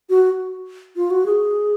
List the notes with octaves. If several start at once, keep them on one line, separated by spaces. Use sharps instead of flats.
F#4
F4
F#4
G#4